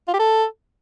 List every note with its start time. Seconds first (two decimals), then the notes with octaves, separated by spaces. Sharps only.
0.08 F4
0.14 G4
0.19 A4